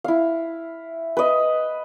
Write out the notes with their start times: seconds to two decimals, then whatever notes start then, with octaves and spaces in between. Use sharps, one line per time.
0.04 E4 F5
1.17 B4 D#5